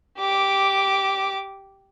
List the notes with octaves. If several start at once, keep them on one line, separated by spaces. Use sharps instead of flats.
G4 D6